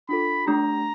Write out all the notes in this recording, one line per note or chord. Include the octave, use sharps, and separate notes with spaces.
D4 F4 A4 B5
A3 D4 G4 A#5